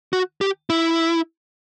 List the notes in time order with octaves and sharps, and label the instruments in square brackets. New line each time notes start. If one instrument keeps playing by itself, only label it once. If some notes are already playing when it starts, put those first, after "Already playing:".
[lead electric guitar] F#4
G4
E4